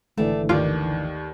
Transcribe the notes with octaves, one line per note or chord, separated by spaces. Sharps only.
G#1 D3 E3 A3 D4 G4
D#2 D#3 F4 D5